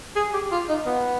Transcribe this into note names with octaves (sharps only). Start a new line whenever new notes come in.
G#4
G4
F4
D#4
B3